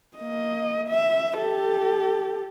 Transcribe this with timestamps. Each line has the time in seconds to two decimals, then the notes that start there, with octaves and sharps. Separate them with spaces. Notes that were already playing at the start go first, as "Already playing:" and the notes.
0.17 A#3 D#5
0.88 E5
1.39 G4 A4